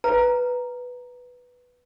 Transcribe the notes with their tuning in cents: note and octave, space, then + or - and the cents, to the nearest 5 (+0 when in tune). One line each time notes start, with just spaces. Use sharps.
B4 +0 A#5 +0